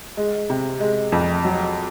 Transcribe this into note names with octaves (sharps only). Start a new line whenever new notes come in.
G#3
C3
G#3
F2
F#3